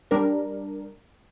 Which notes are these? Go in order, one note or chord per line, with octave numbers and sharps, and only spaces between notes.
G3 D4 A#4